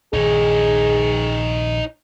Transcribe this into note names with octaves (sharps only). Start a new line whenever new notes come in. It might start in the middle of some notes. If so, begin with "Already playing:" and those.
A#1 D#3 D#4 G#4 C#5